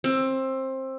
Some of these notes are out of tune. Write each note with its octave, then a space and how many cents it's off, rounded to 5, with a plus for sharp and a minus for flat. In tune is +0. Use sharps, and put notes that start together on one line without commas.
C4 +20